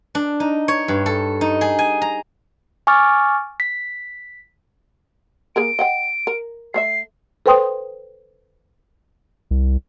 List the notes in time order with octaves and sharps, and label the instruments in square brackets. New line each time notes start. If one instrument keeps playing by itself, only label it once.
[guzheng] D4
D#4
C#5
G2
A4
D#4
G#4
G#5
A#5
[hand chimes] G#5 C#6 D6 F6 A6
B6
[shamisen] A#3 G#4 A#4 [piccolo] D7
[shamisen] D#5 F#5 G5
A#4
[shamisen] A3 C#5 E5 [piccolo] C7
[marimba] A4 B4 C5 G5 C6 D#6
[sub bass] C2